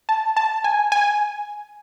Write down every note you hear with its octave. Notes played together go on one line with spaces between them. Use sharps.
A5
A5
G#5
G#5